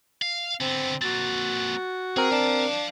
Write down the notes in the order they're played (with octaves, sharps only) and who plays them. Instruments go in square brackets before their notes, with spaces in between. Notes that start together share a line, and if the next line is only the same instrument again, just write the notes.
[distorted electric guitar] F5
[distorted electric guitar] D3 B3 [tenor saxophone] C4
[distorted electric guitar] A#3 C4 [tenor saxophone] F#4 [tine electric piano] A6
[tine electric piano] C4 A#4 [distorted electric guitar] G#4
[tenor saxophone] D4 [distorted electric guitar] F5 A5